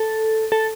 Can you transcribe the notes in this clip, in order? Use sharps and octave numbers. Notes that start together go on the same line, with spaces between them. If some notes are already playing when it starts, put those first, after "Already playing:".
Already playing: A4
A4